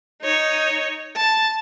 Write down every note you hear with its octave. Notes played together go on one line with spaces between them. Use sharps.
D#4 C#5
A5